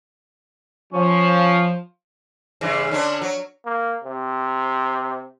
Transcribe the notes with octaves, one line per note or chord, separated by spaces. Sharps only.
F3 C#4
G2 C#3 E3
D3 C#4 D4
F#3
A#3
C3